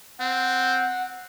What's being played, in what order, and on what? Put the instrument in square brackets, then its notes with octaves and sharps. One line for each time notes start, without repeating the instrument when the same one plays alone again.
[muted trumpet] C4 [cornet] F#5